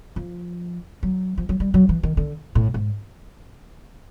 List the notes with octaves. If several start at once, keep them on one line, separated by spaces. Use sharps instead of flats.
F3
F#3
F3
F#3
G3
F#3
E3
D#3
D3
A2
G#2